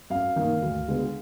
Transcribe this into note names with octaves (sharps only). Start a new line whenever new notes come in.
F#2 F5
D#3 A#3
D2
D3 G#3 B3